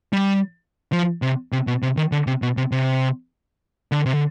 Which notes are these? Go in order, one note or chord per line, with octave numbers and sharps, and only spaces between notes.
G3
F3
C3
C3
B2
C3
D#3
D3
C3
B2
C3
C3
D3
C3
D3